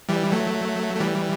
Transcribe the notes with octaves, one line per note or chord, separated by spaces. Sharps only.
E3 G3
F#3 A3
A3
E3 G3